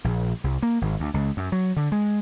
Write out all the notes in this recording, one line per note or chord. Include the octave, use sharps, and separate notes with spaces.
A#1
C2
A#3
G#1
D2
C#2
F#2
F#3
D3
G#3